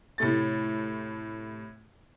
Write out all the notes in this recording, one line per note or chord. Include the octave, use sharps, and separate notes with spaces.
A2 C3 A3 A6